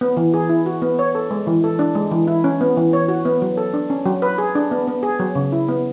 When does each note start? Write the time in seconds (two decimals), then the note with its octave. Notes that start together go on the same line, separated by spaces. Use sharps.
0.01 B3
0.17 E3
0.34 G#4
0.49 E4
0.66 F#4
0.82 B3
0.99 C#5
1.15 A4
1.31 G#3
1.47 E3
1.64 A4
1.79 D4
1.95 G#3
2.11 E3
2.27 E4
2.44 C#4
2.61 B3
2.77 E3
2.93 C#5
3.08 F#4
3.25 B3
3.42 F#3
3.57 A4
3.74 D4
3.90 C#4
4.05 F#3
4.22 B4
4.38 G#4
4.55 D4
4.71 B3
4.88 B3
5.03 G#4
5.20 F#3
5.35 C#3
5.52 E4
5.68 B3